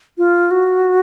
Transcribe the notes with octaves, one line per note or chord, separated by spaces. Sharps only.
F4
F#4